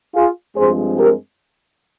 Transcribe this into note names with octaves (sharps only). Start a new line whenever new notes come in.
F4 G#4
G2 F3 G#3 C4 G#4 C5
G4 A#4